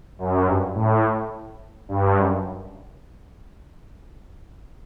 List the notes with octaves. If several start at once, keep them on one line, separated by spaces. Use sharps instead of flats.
F#2
G2
A2
G2
F#2